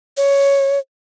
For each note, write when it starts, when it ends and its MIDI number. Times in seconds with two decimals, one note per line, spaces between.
0.17 0.79 73